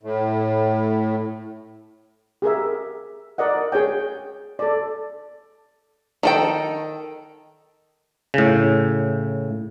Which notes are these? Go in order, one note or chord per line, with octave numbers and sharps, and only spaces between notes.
A2
G4 G#4 A#4 E5
A#4 D5 D#5 F#5
G#4 C#5 G5
A4 D5
D#3 A4 G5
A2 C#3